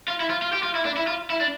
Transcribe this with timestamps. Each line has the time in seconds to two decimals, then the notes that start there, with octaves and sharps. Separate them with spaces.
0.08 F4
0.20 E4
0.30 F4
0.42 F4
0.53 G4
0.63 F4
0.75 E4
0.85 D4
0.97 E4
1.07 F4
1.30 E4
1.41 D4